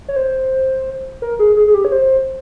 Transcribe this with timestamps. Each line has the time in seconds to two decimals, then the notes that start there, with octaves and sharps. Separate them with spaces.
0.08 C#5
0.16 C5
1.22 A#4
1.39 G#4
1.57 G#4
1.67 G#4
1.74 G4
1.85 C#5
1.92 C5